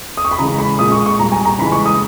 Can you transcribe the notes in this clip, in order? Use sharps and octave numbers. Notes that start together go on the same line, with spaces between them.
D#6
C#6
B5
C#3 E3 G#3 A#5
B5
A#2 G#3 D#6
C#6
C#6
A#2 G3 A#5
G#5
A#5
C#3 E3 G#3 B5
C#6
D#6